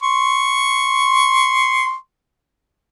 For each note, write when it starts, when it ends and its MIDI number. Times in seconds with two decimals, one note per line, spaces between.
0.03 1.95 84
0.03 1.95 85